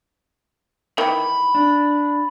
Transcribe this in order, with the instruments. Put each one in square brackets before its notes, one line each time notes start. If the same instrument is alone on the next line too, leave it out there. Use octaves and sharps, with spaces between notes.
[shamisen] D#3 E3 [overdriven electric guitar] B5
[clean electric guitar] D4